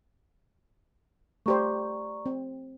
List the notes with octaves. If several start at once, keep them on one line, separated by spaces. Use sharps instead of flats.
A3 G4 C5 D5 A#5 C#6
C4